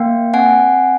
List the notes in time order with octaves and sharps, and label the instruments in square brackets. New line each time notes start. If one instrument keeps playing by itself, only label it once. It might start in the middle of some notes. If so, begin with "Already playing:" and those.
Already playing: [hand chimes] A#3 F5 G5
C4 F#5 G#5